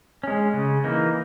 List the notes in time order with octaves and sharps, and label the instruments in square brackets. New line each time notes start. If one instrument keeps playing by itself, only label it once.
[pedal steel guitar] G#3 C#4
C#3
E3 A#3 D#4